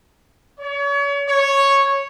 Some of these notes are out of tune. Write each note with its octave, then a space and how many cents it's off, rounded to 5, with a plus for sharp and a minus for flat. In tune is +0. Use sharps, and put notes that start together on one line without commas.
C#5 +35
C#5 -5